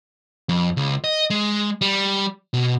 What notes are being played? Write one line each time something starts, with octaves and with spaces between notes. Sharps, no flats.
F2
C#2
D#5
G#3
G3
B2